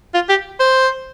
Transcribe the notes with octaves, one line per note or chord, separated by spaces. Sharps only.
F4
G4
C5